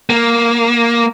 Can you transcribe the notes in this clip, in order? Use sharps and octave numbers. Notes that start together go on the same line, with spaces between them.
A#3